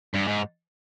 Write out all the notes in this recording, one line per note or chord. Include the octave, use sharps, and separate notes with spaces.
G2
G#2